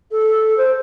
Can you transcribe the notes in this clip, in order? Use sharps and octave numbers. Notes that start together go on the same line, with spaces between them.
A4
C5